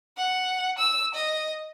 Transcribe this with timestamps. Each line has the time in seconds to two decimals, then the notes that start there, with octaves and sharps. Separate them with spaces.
0.17 F#5
0.78 E6
1.14 D#5